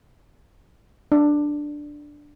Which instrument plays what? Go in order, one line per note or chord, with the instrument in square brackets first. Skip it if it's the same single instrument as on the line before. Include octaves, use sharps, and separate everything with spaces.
[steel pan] D4